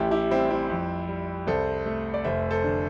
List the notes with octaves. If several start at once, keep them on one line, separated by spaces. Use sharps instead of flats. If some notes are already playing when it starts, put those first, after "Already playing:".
Already playing: A1 A3 E4 G4
E4 G4
G3 C4 E4
C4 E4
F2
G3
C2 A4 C5
A3
D5
F1 C5 E5
A4 C5
D3